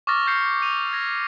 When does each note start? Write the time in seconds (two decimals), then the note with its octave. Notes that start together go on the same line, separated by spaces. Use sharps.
0.07 C#6 D6 E6 F6 A6 A#6
0.26 C#6 F6 G6 C7 C#7
0.62 D#7 F7
0.93 G#6 A#6